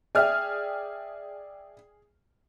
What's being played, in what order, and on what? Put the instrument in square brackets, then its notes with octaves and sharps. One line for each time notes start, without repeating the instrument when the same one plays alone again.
[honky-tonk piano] G#4 F6 [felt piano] D5 E5 G5